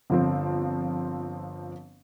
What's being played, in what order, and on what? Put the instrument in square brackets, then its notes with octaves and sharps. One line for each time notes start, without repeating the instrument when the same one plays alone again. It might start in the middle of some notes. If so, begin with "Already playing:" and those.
[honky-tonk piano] G1 F3 C4